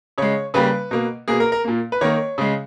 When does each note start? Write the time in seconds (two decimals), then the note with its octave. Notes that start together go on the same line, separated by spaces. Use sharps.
0.18 C#3 G#3 C#5
0.54 C#3 G3 A#3 B4
0.91 B2 A#3
1.28 B2 A#3 G#4
1.40 A#4
1.52 A#4
1.65 A#2 A#3
1.92 B4
2.01 D#3 A#3 C#5
2.38 C#3 G#3